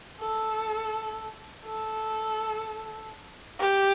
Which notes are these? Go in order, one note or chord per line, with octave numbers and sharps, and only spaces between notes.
A4
A4
G4